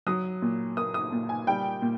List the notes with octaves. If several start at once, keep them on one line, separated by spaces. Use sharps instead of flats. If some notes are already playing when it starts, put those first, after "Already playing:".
F#3 D#6
A#2
A#3 D#6
D#6
A#2
G#5
G3 G5
A#2